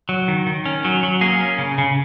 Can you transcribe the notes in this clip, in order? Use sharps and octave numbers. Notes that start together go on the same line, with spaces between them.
F#3
D#3
D#3
C#4
F#3
F#3
A#3 G#4
C#4
C#3
C#3